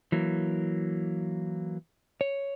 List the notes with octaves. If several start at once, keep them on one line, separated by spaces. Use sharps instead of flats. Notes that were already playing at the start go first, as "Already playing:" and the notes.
E3 F#3 A#3
C#5